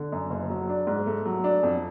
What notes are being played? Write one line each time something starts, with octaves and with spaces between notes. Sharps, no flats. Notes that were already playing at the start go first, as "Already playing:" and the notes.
Already playing: D3
F#2
F#1
F#3
D4
G#2
A3
F#3
D4
F2